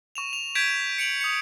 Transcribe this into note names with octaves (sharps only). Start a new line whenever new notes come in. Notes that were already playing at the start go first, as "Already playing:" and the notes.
C#6 E7 F7
F7
G6 G#6 B6 D7 E7 F7
C#7 D7 F7 F#7
D#6 C#7